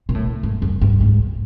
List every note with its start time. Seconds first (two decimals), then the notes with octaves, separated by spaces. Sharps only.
0.09 A#2
0.14 A2
0.43 G#2
0.62 F#2
0.81 G2
1.01 G#2